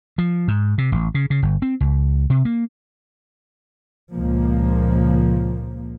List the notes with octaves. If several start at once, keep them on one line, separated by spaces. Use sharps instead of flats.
F3
G#2
C3
A1
C#3
C#3
G1
C4
C#2
C3
A#3
C#2 A#2 F3 A#3